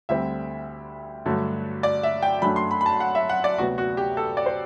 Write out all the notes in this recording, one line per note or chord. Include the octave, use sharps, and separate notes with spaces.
D2 D3 G3 C4 E5
G2 D3 F#3 A3
D5
E5
G5
F#2 F#3 A3 D4 B5
C6
B5
B5
A5
F#5
E5
F#5
D5
D2 C3 F#3 B3 F#4
F#4
G4
A4
D5
C5